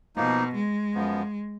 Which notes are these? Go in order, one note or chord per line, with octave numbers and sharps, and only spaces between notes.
B2 F3 A#3 D#4
G#3
F#2 F3 B3